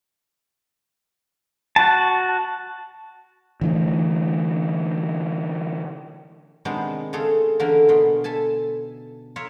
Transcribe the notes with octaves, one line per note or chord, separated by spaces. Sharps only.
F#4 A5
D3 E3 A3
C3 D#3 G#3 B3 C#4 D4
C#3 C#4 F4 G#4 A4
D3 E3 A#3 C#4 A#4
B2 F4
A4 E5 G#5 A5
F4 A#4 C#5 E5